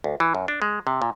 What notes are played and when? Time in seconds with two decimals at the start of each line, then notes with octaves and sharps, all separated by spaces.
0.04 D2
0.20 E3
0.35 F#2
0.48 D4
0.62 G#3
0.87 C3
1.02 A#2